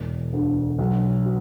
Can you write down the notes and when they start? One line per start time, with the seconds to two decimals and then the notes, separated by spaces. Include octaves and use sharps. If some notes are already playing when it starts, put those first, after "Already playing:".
Already playing: E1
0.33 D2 D3
0.79 B1
1.25 B2